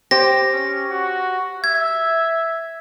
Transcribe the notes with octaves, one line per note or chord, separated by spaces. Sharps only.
G4 C5 A#6
C#4
F#4
E5 G#6